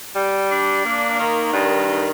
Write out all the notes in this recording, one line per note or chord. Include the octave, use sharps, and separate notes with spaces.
G3
D4
A#3
D#3
G2
D#3